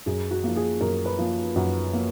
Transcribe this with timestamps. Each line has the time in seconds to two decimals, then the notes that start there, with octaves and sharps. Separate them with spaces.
0.06 F#2 G#4
0.31 F#4
0.44 F3 A#3
0.56 G#4
0.81 F#2 A#4
1.06 B4
1.18 F3 A#3
1.56 F#2 F#5
1.93 F3 A#3